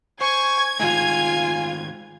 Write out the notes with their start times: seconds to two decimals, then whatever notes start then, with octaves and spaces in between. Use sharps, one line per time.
0.21 C5 G#5 C#6 G#6
0.79 D#3 G#3 A3 F4 G#5